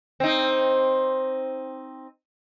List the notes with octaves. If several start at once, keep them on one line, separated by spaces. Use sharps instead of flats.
C4 D#4